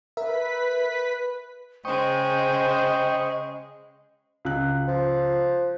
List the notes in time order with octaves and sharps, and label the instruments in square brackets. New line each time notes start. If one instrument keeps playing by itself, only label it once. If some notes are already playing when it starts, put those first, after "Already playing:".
[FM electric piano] A#4 E5 [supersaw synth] B4 B6
[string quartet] C#3 G#3 [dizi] C5 [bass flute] D#5 [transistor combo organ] G5 C#6 D#6
[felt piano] C#2 F#6
[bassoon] F3